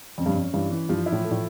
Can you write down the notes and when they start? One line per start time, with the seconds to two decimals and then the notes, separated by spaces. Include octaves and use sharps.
0.18 F2 C#4
0.26 G2
0.34 F2 C#4
0.53 G2 E3
0.71 E3
0.89 G2 F3
1.06 E4
1.12 A2
1.24 A3
1.31 A2